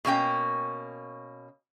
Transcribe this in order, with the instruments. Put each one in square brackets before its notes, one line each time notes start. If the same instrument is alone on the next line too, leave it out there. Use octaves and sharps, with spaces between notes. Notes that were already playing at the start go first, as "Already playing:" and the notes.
[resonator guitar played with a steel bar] B2 A#3 C#4 G5